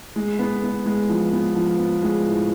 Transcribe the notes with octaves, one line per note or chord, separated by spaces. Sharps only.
G#3
B3
B3
G#3
F3
B3
F3
B3
G#3
A2